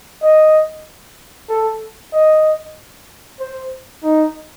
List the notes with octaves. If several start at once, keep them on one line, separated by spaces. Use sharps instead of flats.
D#5
A4
D#5
C5
D#4